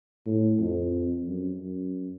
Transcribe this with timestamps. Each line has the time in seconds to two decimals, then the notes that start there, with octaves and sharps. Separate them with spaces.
0.26 A2
0.60 F2
1.28 F#2
1.61 F#2